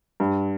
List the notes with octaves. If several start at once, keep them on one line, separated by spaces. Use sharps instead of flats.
G2